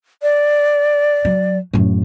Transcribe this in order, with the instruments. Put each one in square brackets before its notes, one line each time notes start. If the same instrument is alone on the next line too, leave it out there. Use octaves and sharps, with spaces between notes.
[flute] D5
[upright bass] F#3
F#2 A2